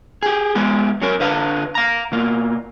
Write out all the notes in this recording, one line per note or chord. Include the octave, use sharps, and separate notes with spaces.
G4 G#4
G#3 B3 G4
F#3 C#4 A#4
D3 B4 F5
F5 A#5
B2 A#3